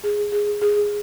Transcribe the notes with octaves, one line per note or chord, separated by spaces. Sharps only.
G#4
G#4
G#4